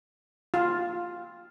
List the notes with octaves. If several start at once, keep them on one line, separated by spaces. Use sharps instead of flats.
F4